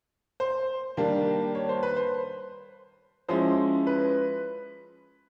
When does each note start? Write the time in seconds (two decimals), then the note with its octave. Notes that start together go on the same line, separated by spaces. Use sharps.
0.40 C5
0.97 D#3 G3 A#3 D4
1.55 C#5
1.69 C5
1.83 B4
1.97 C5
3.29 F3 G#3 C#4 E4 C5
3.87 B4